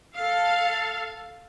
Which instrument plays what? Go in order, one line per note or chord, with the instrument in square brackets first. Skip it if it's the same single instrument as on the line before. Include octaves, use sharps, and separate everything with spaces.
[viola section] A4 F5